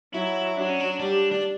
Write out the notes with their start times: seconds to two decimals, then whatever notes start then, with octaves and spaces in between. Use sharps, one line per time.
0.14 F#3 E4
0.57 F#3 D4
0.69 C#4
0.80 D4
1.00 G3 D4
1.32 D4